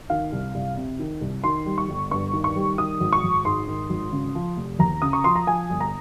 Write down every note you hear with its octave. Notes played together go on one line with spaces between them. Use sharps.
D#3 F5
C2
C2
C3
D#3
C2
D#3 C6
G3
C#6
G1
G2 C#6
D#3
C#6
G3
D#3 D#6
G#1
C#6
G#1
G#2 C6
D#3
G#1
C#3
F3
F1
D#2 A#5
C#3 D#6
C#6
F3 C6
A#5
F3 G#5
G1
A#5